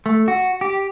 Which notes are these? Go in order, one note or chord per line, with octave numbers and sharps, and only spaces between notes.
A3
F#4
G4